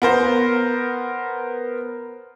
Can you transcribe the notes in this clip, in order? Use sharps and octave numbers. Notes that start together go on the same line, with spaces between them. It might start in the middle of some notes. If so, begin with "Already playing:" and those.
B3 A#4 C5